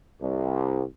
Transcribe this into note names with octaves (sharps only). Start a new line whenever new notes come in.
C2